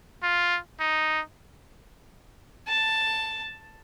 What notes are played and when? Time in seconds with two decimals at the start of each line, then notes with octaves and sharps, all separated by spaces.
0.23 F4
0.80 D#4
2.68 A5